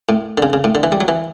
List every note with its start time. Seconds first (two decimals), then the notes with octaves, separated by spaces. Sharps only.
0.09 A2
0.38 D3
0.42 C#3
0.53 C#3
0.64 A2
0.75 D3
0.83 E3
0.92 G3
1.01 F#3
1.08 E3